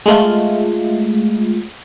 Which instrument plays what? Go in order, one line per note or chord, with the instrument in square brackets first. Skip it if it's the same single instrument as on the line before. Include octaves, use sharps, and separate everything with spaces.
[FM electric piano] G#3 A3 F4